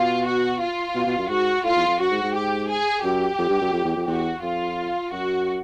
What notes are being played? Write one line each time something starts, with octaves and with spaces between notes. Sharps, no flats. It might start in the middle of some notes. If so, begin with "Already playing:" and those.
Already playing: B2 F4
F#4
F4
B2
B2
F#2
G#2 F#4
A2 F4
E2
F2
F#2 F#4
G#2
G#2
G4
G#4
F#2 G4
F2
G2
F#2
F2
E2
F2
E2 F#4
F2 F4
F#2 F#4